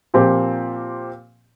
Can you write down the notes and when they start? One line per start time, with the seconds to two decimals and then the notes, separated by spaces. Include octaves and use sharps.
0.14 A#2 F3 C4 G4